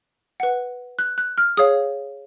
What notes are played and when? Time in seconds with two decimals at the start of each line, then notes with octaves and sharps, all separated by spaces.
0.40 B4 F#5
0.99 F#6
1.18 F#6
1.38 F6
1.57 G#4 C#5 F5 D#6